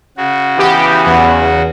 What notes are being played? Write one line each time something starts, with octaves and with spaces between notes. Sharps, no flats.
C#3 F#4
E3 B3 G4
E2